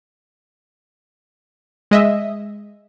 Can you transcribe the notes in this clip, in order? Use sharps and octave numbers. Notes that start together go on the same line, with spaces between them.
G#3 D#5 E5